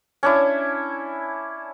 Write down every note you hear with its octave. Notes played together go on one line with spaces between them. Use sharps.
C#4 D4 E4